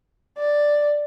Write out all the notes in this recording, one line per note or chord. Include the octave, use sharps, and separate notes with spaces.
D5